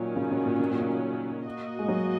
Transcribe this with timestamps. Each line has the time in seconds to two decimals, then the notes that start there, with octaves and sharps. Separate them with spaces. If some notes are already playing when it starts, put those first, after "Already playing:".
Already playing: A#2 D#3 F#3 C#4
0.16 C#3
0.31 C#3
0.46 A#2
0.60 C#3
0.71 A#2
0.81 C#3
1.45 A#3 F#4 D#5
1.79 G#3
1.88 F#3